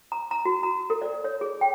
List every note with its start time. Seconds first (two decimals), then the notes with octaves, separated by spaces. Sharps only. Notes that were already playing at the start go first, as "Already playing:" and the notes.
0.12 A#5
0.31 A#5
0.45 F#4
0.63 A#5
0.90 A4
1.02 D5
1.24 C#5
1.41 G#4
1.61 G5